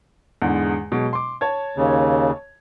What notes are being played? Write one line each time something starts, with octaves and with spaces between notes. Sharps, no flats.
E2 G#2 D3
B2 F#3 G#3
C6 D6
C#5 A5 G#6
D#2 C#3